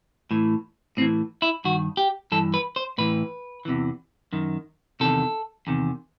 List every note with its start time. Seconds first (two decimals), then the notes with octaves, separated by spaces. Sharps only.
0.31 A2 E3
0.97 A2 C4
1.02 E3
1.42 E4
1.65 G2 D#3 F#4
1.97 G4
2.32 G2 E3 A4
2.54 B4
2.76 C5
2.98 A2 E3 B4
3.65 E2 C3 E3
4.33 F#2 D#3
5.00 E2 C3 D#3 A4
5.67 E2 C3 D#3